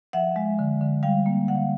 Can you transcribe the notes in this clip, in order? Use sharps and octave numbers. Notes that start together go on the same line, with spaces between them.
F3 E5 F#5
G#3
D3
D3
G3 F5 G5
A#3
D3 F#5
F5